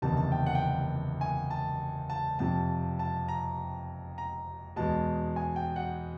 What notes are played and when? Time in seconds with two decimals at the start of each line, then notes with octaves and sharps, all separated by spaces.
0.02 F#1 E2 C3 D#3 A5
0.17 A5
0.32 G5
0.46 F#5
0.55 G5
0.61 F#5
1.21 G#5
1.50 A5
2.10 A5
2.39 F2 C3 F3 A5
2.99 A5
3.28 A#5
4.18 A#5
4.76 E2 B2 G#3 A5
5.36 G#5
5.56 G5
5.76 F#5